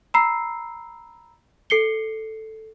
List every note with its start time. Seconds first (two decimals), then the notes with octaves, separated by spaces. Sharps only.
0.14 A#5 B5 E6 C7
1.70 A4 C7 C#7 G7